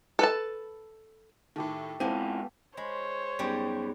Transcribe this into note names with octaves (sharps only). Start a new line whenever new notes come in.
A4 B4 A5
A2 D#3 G4 A4
G#2 B3 C4 E4 G4 A4 F5 D#7
G#3 C5 C#5 B5
F#2 G3 B3 D#4 G4 G#4